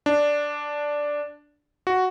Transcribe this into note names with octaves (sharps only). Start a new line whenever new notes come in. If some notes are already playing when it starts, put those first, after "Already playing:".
D4
F#4